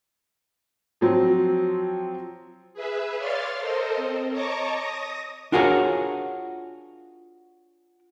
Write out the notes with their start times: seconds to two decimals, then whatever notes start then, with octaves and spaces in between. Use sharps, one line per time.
1.01 F3 F#3 C4
2.74 G#4 B4 E5
3.17 C#5 D5 F5 C6 F6 A6
3.58 A4 A#4 C5 D#5
3.96 C4
4.31 C#5 D#5 A5 A#5 C#6 D6
4.79 D#6 A#6
5.52 D4 F4 F#4 G#4 A#4 C#5